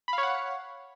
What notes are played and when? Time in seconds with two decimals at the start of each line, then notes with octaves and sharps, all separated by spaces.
0.08 B5
0.13 F5
0.18 C#5
0.23 F#5